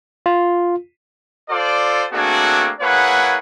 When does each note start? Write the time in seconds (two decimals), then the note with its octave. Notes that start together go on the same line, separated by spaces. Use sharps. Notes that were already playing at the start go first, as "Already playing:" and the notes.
0.26 F4
1.50 F4 A4 C5 D5
2.12 A3 A#3 C4 D4 F#4 G#4
2.81 A#3 E4 G#4 B4 C#5 F#5